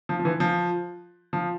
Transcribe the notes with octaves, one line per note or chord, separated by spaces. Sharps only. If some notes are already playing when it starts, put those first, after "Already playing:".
F3
F3
E3
F3
F3